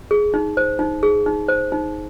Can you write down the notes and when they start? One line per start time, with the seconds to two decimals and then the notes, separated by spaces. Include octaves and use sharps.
0.11 G#4
0.34 D#4
0.57 C5
0.79 D#4
1.03 G#4
1.26 D#4
1.48 C5
1.72 D#4